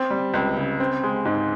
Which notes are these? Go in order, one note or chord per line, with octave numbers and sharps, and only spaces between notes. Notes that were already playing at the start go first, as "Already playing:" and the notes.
Already playing: C4
G3
C#2
C#3
C4
G#3
G#2